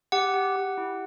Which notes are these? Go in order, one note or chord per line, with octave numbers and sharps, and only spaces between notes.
G4 F#5
G4
G4
E4